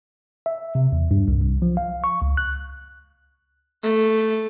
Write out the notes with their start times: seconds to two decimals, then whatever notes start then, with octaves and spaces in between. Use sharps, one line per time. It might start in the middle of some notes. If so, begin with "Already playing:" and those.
0.46 E5
0.75 C3
0.92 E2
1.11 G2
1.28 C2
1.41 C2
1.62 F3
1.77 F5
2.04 C#6
2.22 C#2
2.37 F#6
3.83 A3